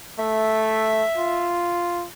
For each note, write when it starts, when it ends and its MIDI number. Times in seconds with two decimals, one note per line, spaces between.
0.19 1.04 57
0.19 1.58 76
1.17 2.06 65